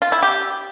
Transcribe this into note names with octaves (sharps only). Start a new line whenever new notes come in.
F4
E4
G4